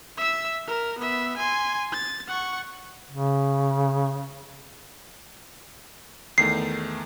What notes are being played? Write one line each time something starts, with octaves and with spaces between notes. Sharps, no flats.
E5 E6
A#4
B3 E5
G#5 C6
A6
F#5 C#6
C#3
E2 D#3 A3 C7